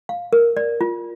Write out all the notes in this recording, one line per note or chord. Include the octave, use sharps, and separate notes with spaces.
F5
A#4
D5
F4